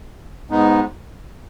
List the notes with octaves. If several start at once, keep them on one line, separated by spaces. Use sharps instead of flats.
G#2 G#3 B3 D#4